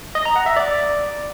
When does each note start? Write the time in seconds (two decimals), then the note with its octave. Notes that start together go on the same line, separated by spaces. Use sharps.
0.15 D#5
0.25 A#5
0.36 F#5
0.46 E5
0.56 D5